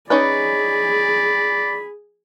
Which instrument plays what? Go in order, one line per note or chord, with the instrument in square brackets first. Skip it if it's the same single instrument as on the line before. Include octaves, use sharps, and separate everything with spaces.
[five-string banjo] C#4 D#4 B4 [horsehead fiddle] G#4 [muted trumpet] D5 [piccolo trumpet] B5